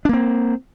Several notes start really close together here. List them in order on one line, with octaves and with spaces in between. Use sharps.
D4 A#3 C4